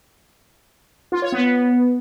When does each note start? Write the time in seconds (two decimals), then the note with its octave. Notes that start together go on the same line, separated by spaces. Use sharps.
1.12 F4
1.22 C#5
1.32 B3